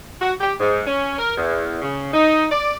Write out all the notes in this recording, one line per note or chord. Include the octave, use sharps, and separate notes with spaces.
F#4
G4
G#2
C#4
A#4
E2
C#3
D#4
D5